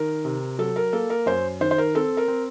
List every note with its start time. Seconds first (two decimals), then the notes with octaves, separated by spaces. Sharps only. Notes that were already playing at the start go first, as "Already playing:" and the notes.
Already playing: D#3 A#4
0.25 C3
0.59 F#3 A4
0.76 A#4
0.93 A#3 A4
1.10 A#4
1.26 F#2 C5
1.61 D#3 C5
1.71 C5
1.78 A#4
1.95 C4 A4
2.17 A#4
2.28 C4